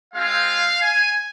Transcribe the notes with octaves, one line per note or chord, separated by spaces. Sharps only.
G#3 C4 F4 F5
G#5